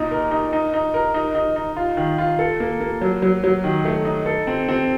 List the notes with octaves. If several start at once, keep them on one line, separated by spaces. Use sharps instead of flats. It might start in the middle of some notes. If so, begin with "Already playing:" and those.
Already playing: A#2 D#4
A#4
D#4
D#4
D#4
A#4
D#4
D#4
D#4
F4
D#3
F4
A4
A#3
A#3
F#3
F#3
F#3
D#3
A3
D#4
A4
C4
C4